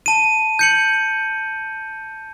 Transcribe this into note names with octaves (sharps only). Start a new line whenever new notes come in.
A5 D#7
G6 C#7 F#7